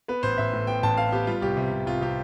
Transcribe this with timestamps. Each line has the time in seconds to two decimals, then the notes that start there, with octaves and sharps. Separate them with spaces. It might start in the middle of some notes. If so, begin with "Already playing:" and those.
0.08 B3 B4
0.23 A1 C5
0.38 A1 E5
0.53 A2
0.67 B3 G5
0.83 A1 A5
0.97 B3 F5
1.12 B3 G4
1.27 G3 F4
1.42 C2 G4
1.57 C3
1.72 C3
1.86 C2 F4
2.01 C3 G4